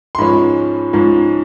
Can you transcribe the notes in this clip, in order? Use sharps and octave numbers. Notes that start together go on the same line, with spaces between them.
C6
G#2 F3 G#3 C#4 B5
G#2 F3 G#3 C#4